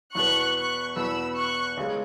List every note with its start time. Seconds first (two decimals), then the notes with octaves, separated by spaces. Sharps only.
0.15 E2 B2 B3 C#6 F#6
0.56 C#6 F#6
0.96 E2 B2 B3 B5 E6
1.36 C#6 F#6
1.77 C#2 C#3 G#3